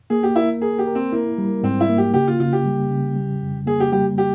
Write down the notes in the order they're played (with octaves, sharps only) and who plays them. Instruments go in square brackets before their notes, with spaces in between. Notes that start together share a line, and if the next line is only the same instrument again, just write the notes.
[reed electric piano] A#3 [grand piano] G#4
[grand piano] G4
[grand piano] E4 [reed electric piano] A#4
[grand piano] G#4 [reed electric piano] A#4
[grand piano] G4
[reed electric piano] A#4
[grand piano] C4
[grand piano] A#3 [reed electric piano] E4
[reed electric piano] G3
[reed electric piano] G#2 [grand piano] C4
[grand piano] E4
[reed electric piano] A#3
[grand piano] G4
[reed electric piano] C#3 [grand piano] G4
[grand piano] F4
[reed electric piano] C#3 [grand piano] F4
[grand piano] G4
[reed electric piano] G3
C#3
G3
F2
[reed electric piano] A#3 [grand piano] G#4
[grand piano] G4
[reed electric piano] G3 [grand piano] G4
[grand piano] G4